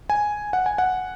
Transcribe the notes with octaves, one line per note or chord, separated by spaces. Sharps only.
G#5
F#5
G#5
F#5